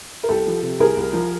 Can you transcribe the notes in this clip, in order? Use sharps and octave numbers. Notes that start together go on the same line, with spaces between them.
A#4
C2 G4 A4
F3
C3
C2 G#4 A#4
C2
F3